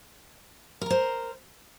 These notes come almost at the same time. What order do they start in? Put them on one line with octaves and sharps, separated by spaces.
A#4 A#5 C5